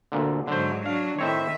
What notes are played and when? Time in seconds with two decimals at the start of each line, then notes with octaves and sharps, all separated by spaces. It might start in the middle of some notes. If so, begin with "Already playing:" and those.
0.12 D2 A#2 D3
0.48 G#2 D3 F#3 C5
0.86 F#3 D4 F5
1.19 A2 D#3 C4 C#5 E5